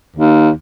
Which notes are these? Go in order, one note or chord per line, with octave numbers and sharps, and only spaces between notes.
D#2